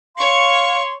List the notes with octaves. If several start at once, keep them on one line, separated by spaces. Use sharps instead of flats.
C#5 F5 C6 C#6